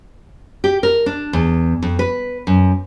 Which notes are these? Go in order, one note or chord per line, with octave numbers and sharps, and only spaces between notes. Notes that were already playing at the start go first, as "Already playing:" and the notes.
G4
A#4
D4
E2
F2
B4
F#2